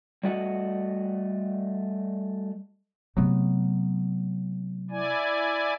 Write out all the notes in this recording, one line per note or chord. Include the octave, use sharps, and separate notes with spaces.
G3 A3 F#4 D#5 F#5
C3 F#3 A3 B3
E4 D5 G#5